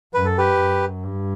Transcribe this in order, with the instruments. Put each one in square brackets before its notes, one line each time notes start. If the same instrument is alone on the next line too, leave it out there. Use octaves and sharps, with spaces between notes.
[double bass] F#2 [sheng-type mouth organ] B4
[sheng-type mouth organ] A4
G4 B4
[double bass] F#2
G2